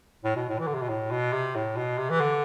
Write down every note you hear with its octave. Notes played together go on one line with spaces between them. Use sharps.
A2
B2
A2
E3
D3
C3
B2
A2
B2
C3
A2
B2
C3
E3
D3